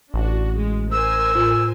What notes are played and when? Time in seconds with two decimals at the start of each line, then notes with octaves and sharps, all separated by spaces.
0.14 A1 D4 F#4
0.55 G#3
0.92 A#4 C5 G#5 E6
1.35 A2 F4